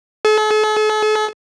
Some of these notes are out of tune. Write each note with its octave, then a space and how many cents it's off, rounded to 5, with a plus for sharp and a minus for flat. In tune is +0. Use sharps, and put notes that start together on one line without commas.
A4 -45